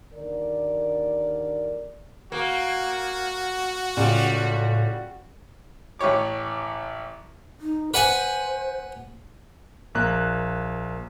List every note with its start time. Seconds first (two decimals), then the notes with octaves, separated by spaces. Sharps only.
0.14 D#2 D3 A#4 D5
2.32 A#3 F#4
3.97 C#2 A2 G3
5.99 A1 E4 G4 C#5 D6
7.61 D#4
7.94 B4 C5 F#5 G#5
9.95 A#1 A#3 F#6